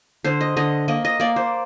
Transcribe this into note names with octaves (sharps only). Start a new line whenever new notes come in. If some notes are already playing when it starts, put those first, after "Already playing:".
D3 C5
D#5
D3 D#5
A#3 D#5
D#5
A#3 D5
C5